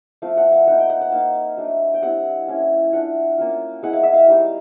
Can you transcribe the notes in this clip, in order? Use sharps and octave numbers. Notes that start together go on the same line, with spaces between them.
F3 A3 C4 F5
F#5
F5
A#3 D#4 F#5
G5
F#5
F#5
A#3 D#4 F5
F#3 A3 D4
G5
G3 C4 E4 F#5
A#3 C#4 E4
A3 D4 F4 F#5
A#3 C#4 F4
G#3 C4 E4 F#5
F5
E5
F5
G3 C4 D#4